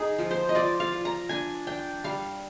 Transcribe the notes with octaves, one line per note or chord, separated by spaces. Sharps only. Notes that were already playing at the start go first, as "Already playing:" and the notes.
Already playing: D#4 G#4
F3
C5
D#5
F4 D5
F5
F4
A#5
D4 G#5
D4 G5
G3 F5